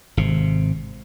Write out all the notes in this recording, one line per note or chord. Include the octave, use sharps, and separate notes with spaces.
G#1 C3